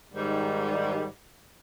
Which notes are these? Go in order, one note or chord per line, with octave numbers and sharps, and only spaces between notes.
G#2 D#3 G3